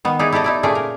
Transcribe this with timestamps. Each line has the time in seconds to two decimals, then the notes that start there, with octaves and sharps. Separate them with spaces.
0.05 D#3 B3
0.19 D#4 E4 G#4 B4 D5
0.32 E4 G4 A4 D5 D#5
0.44 D#4 E4 D5
0.63 A#2 A3 C#4 G#4 D5
0.75 A#4